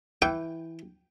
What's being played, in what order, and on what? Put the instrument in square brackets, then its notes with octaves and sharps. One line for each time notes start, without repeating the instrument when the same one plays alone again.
[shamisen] E3 [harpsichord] G5